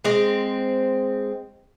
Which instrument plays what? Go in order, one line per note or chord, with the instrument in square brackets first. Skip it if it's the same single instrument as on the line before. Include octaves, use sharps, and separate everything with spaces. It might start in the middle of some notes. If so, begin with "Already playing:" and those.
[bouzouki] G#3 C4